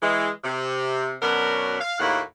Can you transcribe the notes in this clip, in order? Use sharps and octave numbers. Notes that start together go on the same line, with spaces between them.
E3 G#3
C3
F#2 B2 F#3 B3 D4 A#4
F5
D#2 A2 A#3 E4 F#4 F#5